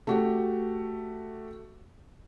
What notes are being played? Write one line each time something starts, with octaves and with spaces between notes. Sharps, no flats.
A3 F#4 G4